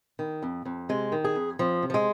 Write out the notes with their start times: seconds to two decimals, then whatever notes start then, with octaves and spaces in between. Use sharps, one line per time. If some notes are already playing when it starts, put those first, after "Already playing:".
0.19 D#3
0.42 F2
0.65 F2
0.89 C3 G#3
1.12 D#3
1.24 G#4
1.35 F2
1.59 F2 F3
1.83 C3
1.90 F3
1.94 G#3